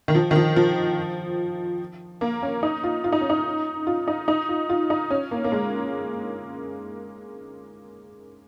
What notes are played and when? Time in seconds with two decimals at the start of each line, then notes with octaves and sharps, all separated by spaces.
0.08 D#3
0.15 F3
0.31 D#3
0.36 F3
0.56 F3
2.21 A#3
2.43 C#4
2.63 D#4
2.84 F4
3.04 F4
3.12 D#4
3.21 C#4
3.30 D#4
3.87 F4
4.08 D#4
4.28 D#4
4.49 F4
4.69 F4
4.90 D#4
5.10 C#4
5.31 A#3
5.44 A#3
5.52 G#3